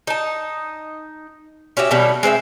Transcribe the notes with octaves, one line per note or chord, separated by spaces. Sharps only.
D#4 A5
C#4 F#4 G4 E5
B2 D#3 G3 C#4
G#3 C4 D5 E5